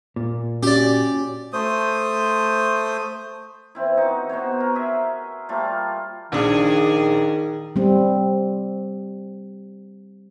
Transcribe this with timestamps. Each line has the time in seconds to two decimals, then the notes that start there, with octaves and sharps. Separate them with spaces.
0.16 A#2
0.63 C#4 F#4 G4 D5
1.53 A3 C5 D#6
3.75 E3 C4 E4
3.97 D#4 F#4
4.29 B2 B3 C5 C#5
4.60 A#4
4.75 G#4 E5
5.49 G3 A3 A#3 F4
6.32 A#1 D#3 D4 G#4
7.76 G3 C4